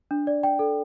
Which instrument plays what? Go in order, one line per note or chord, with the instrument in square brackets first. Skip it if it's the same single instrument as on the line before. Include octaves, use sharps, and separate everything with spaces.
[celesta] D4
D5
G5
A4